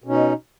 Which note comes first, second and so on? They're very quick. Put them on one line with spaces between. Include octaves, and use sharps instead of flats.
B2 C#4 D#4